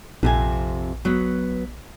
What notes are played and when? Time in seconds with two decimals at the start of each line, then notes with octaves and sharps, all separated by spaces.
0.23 A#1 F2 C3 G#5
1.05 F#3 B3